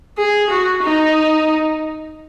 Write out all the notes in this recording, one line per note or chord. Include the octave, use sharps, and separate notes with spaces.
G#4
F#4
D#4